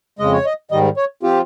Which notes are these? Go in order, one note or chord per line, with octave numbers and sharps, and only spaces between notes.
F2 C#3 G#3 D#5
C#5
D#5
G#2 D#3 G3 D#5
C#5
F3 C4 F4 G4